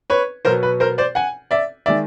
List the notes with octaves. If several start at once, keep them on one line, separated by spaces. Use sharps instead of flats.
B4 C#5
B2 F#3 B3 A#4 C5
B4
A#4 C5
C5 D5
F#5 G#5
D5 E5
D#3 G#3 D5 E5